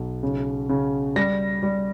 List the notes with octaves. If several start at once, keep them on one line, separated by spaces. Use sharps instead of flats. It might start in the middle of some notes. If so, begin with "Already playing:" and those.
Already playing: B1
C#3
C#3
G3 A#6
G3